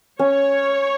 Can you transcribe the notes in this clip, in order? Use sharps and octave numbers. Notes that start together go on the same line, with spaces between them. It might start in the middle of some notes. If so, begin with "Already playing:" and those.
C#4 C#5